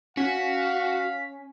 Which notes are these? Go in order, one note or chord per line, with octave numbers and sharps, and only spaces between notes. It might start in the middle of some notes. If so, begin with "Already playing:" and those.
C#4 F#4 F5 B6